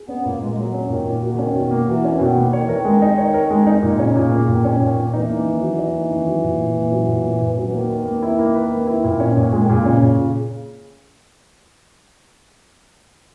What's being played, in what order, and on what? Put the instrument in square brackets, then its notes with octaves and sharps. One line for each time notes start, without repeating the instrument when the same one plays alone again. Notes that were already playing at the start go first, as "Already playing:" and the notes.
Already playing: [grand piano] G#4
[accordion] B3 [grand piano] C#4
[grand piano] A#2 [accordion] A#3
[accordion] G#3 [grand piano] A#3
[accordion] G#3
[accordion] F#3 [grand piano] G#4
[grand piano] C#4
[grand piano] A#2 [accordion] D#3
[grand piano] A#3
[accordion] D#3 [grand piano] F#4
[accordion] C#3
[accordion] D#3 [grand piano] C#4
[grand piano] B2
A#3
[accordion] E3 [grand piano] F#4
[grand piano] C#4
[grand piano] B2 [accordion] D#3
[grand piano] A#3
[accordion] D#3 [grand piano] C#5
[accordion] E3
[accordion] D#3 [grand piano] A#4
[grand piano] G#3
D#4
C#5
A#4
G#3
[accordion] D#3 [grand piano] D#4
[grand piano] A#2 [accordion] C#3
[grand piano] C#4
A#2
A#3
[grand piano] A#2 [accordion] D#3
[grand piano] C#4
A#2
A#3
[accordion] E3 [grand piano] D#4
[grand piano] A#3
D#3
F#3
D#4
A#3
D#3
F#3
A#2
A#3
A#2
F#3
A#2
A#3
A#2
F#3
[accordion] E3
[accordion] D#3 [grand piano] A#3
[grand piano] B4
A#3
E4
A#3
B4
A#3
E4
A#2
C#4
A#2
[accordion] D#3 [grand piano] G#3
[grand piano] A#2 [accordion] C#3
[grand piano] C#4
A#2